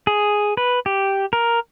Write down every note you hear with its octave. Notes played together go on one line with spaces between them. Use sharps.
G#4
B4
G4
A#4